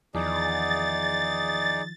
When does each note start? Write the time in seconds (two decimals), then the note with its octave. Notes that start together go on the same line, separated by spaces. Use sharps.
0.15 E2 D#3 F3 D#4 G#4 D5 A6